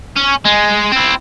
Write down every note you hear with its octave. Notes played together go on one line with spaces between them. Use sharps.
C#4
G#3
C4 E4